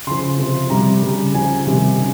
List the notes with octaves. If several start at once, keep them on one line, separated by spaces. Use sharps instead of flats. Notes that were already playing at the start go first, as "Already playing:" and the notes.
C#3 F3 C6
C3 F3
C3 G3 A#5
C#3 G3
C#3 F3 G#5
C3 D#3 G3
C#3